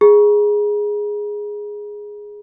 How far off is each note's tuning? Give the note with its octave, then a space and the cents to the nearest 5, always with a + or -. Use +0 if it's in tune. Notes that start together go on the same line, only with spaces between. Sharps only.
G#4 +0 A#5 +40